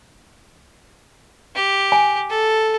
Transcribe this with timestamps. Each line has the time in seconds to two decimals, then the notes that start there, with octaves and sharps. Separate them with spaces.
1.55 G4
1.92 G#5
2.30 A4